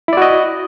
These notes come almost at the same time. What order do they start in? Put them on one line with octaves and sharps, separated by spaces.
E4 D5 F#4 D#5